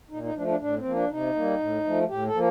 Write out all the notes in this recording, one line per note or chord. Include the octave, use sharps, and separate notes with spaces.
A#2 D#4
D#4
F3 A3 D4
D4
A2 D4
C4
F3 A#3
D4
C3 D#4
G3 A#3
A2
F3 A3
A2 G4
A4
F3 A#3